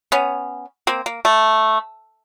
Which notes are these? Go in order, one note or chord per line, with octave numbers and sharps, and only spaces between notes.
B3 C#4
A#3 C4
A#3
A3